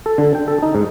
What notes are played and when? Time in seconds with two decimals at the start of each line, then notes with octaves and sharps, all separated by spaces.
0.06 A4
0.18 D3
0.35 G5
0.48 A4
0.63 D#4
0.75 G#2